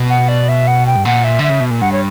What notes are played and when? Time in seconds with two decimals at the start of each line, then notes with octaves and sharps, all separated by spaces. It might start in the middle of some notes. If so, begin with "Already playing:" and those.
Already playing: B2
0.10 F#5
0.28 D5
0.48 E5
0.67 F#5
0.86 G5
0.96 G2
1.05 A#2 F#5
1.24 E5
1.39 D3 E5
1.50 C#3
1.60 B2
1.71 A#2
1.81 G2 F#5
1.92 C#5